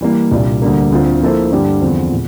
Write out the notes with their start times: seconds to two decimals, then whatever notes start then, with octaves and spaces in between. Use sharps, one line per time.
0.01 E3 G3 A#3
0.32 C2 A#2 G3 D4
0.62 D2 D3 G3 A#3
0.92 D2 D3 A3 C4 F4
1.21 F3 A#3 E4 A4 C5
1.52 G2 D3 G3 D4 G4
1.81 E2 D3 F3 C4
2.11 A#2